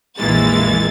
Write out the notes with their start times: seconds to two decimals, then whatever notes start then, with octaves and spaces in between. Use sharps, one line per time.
0.17 A#1 F2 E3 G#3 A#3 A6